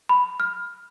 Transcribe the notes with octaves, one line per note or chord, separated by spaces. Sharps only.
B5
F6